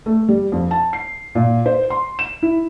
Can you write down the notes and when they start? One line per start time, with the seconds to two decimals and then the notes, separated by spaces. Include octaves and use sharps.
0.06 A3
0.29 G3
0.52 F2
0.71 A5
0.93 C7
1.35 A#2
1.66 C5
1.90 C6
2.19 E7
2.42 E4